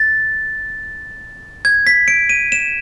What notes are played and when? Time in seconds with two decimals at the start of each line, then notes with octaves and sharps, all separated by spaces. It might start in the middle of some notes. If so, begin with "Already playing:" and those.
Already playing: A6
1.65 G#6
1.87 B6
2.08 D7
2.29 D#7
2.52 E7